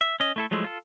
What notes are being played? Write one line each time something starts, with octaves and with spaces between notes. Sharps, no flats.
E5
C#4 D#5
A3 E4 A4
F3 F#3 G#3 A3 E4
F4 A4